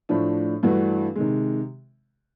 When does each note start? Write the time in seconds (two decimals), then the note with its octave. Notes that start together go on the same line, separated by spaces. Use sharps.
0.09 A2 F3 A3 D4
0.63 G2 E3 A3 D4 F#4
1.16 C3 D#3 G#3